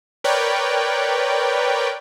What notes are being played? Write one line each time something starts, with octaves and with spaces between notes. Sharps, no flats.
A#4 B4 C#5 D5 G5